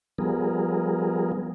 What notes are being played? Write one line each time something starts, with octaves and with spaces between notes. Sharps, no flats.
F3 G3 B3 G#4 A#4